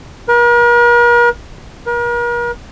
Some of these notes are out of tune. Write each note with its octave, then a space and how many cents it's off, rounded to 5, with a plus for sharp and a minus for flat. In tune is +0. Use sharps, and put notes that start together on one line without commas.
A#4 +45
A#4 +40